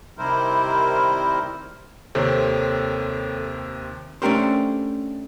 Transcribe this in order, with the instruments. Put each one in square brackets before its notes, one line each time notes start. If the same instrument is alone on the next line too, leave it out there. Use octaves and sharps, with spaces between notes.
[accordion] C3 D#3 G3 E4 A#4 C5
[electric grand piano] D#2 C3 C4 [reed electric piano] A4 C#5
[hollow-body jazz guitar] A3 C#4 D4 G4 A#4 C5